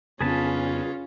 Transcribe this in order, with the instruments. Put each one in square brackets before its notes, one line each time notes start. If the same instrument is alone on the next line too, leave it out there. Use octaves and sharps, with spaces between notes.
[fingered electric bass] F2 C#3 B3 [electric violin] C#4 F4 [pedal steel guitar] G#4 B4 A5